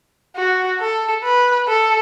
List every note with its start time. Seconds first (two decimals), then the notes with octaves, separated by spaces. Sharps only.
0.36 F#4
0.81 A4
1.24 B4
1.68 A4